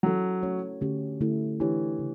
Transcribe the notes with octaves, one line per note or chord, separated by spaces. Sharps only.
F#3 C#4 E4 A4
A3 C#4 F#4 C#5
D3 A3 C#4 G4
D3 A3 E4 A4
E3 A3 D4 G4 C#5
C#3